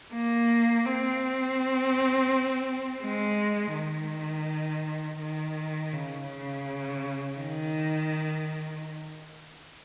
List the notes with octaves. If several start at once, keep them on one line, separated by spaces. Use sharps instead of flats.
A#3
C4
G#3
D#3
D#3
C#3
C#3
D#3